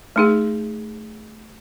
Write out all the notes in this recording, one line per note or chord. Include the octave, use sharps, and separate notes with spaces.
A3 D#4 G#4